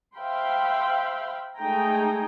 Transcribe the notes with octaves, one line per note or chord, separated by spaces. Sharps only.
C5 E5 F5 G5 B5 C6
G#3 A3 D#4 G5 G#5 A#5